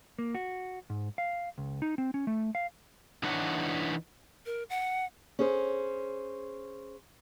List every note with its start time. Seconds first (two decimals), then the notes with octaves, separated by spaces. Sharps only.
0.19 A#3
0.35 F#4
0.90 G#2
1.18 F5
1.58 C#2
1.82 D#4
1.98 C4
2.14 C#4
2.27 A3
2.55 F5
3.23 E3 D4 D#4 B4 C#5 F#5
4.46 A#4
4.70 F#5
5.39 C#4 G#4 C5